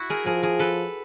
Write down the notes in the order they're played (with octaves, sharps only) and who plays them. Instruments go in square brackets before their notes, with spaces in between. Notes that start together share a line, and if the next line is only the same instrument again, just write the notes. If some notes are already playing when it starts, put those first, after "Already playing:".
Already playing: [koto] E4 F#4
G#4 A#4
[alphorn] F3 [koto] G#4 A#4
[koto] G#4 A#4
A4 B4